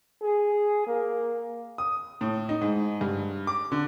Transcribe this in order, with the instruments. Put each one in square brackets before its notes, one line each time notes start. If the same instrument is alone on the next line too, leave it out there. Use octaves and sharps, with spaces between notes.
[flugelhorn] G#4
A#3
[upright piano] D#6
A2
D#4
G#2
G2
D6
D3